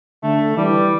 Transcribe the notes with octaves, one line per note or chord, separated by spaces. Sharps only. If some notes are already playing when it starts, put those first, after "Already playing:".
D3 A3
E3 G3